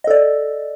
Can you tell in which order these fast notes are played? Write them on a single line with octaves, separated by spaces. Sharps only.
D#5 A4 D5